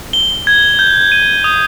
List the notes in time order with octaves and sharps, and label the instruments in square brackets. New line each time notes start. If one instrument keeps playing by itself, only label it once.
[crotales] G7
G#6
G6
D#7
D#6